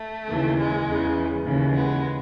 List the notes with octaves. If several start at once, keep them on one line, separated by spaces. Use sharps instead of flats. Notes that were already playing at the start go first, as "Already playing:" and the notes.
Already playing: A3
D#2 C#3 E3
G#3
E2 C#3 E3
D#2 C#3 E3
G#3 B3